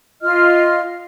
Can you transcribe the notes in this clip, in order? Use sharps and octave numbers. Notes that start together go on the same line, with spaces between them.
F4 D#5 F6